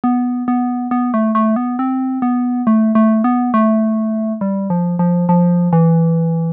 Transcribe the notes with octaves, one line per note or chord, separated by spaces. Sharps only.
B3
B3
B3
A3
A3
B3
C4
B3
A3
A3
B3
A3
G3
F3
F3
F3
E3